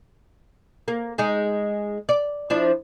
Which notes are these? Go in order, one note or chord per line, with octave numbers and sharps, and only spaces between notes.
A#3
G#3 D#4 G#4
D5
F3 D4 E4